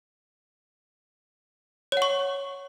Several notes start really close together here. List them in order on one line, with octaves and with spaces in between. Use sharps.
C#5 F#5 C#6